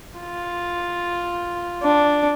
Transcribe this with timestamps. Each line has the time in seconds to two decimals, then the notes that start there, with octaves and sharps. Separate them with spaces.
0.20 F4
1.83 D4